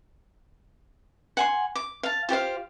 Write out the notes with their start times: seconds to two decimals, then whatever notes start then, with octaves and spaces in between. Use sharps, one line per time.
1.37 F#5 G#5 C6
1.75 D6
2.03 F5 A5
2.29 F4 G4 C5 F5